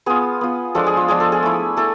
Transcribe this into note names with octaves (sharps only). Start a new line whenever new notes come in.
B3 F4 G#4
B3 F4
F3 G#3 D4 F4 A4
G#4
F4
F3 G#3 D4 F4 G#4
A4
G#4
A3 E4
A3 E4 A4